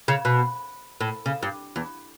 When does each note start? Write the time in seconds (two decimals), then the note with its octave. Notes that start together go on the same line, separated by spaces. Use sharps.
0.08 C#3
0.25 B2
1.01 A2
1.26 C#3
1.43 G2
1.76 E2